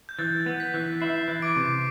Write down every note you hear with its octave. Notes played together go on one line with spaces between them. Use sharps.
G6
E3 A6
B3
B6
E3
E4 C7
E3
D6 D7
C3